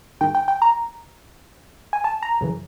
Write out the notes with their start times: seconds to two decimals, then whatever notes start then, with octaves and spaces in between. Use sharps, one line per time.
0.21 G#2 D#3 G5
0.35 G5
0.48 G5
0.62 A#5
1.93 G#5
2.04 A5
2.23 A#5
2.41 F#2 C#3 E3